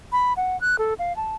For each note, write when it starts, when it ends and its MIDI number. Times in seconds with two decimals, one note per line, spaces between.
0.12 0.33 83
0.37 0.59 78
0.61 0.76 90
0.78 0.94 69
0.99 1.15 77
1.16 1.36 81